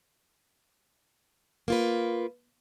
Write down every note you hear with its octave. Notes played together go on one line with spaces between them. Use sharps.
A#3 F4 B4